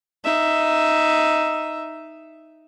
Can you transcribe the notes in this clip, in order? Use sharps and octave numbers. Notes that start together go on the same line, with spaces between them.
D#4 E5